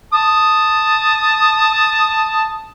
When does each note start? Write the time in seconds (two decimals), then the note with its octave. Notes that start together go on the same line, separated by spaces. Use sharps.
0.13 A5 D#6